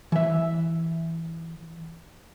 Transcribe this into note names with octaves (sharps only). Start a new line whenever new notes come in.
E3 E5